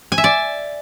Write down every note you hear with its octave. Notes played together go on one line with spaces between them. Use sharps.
G#5
E5
D5